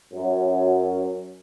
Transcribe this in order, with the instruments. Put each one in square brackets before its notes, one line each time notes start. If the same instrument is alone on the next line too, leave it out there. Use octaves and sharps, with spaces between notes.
[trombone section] F#2